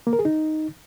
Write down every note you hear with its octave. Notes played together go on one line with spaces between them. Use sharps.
A#3
A#4
G#4
D#4